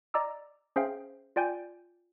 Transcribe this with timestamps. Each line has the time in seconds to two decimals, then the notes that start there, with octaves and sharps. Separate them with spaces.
0.14 D5 D#5 A#5 D6 E6
0.76 C#4 G#4 C5 E5 F5 G5
1.36 F4 D5 G5 G#5 G6